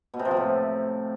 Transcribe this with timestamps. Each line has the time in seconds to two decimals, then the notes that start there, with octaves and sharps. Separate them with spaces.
0.14 B2
0.19 C3
0.25 F3
0.31 C3
0.37 A2